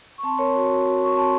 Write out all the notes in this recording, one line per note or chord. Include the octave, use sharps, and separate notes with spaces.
C#6
C4 A5 C6
C4 A#4 C#5
F#4
F#4
F#4
F#4 C#6
C4 A5 C6